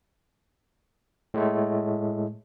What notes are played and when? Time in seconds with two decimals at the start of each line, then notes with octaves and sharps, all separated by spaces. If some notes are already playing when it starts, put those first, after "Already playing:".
1.34 A2 G#3 A3